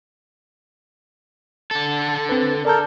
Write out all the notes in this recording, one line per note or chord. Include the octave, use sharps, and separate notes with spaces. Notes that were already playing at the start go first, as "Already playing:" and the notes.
D3 A4
C4 B4
A4 A#4 D5 A5 G6